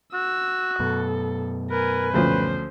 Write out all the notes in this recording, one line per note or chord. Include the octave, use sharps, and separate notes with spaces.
F#4 E6
F#2 B2 A4
A#4 B4 G#5
D2 F3 C#4 C5